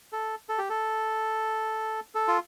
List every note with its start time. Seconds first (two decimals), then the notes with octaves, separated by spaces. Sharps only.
0.13 A4
0.49 A4
0.58 G4
0.70 A4
2.15 A4
2.28 F4